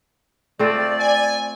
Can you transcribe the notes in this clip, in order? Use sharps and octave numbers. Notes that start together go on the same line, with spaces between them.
A3 C4 F4 D5
G#5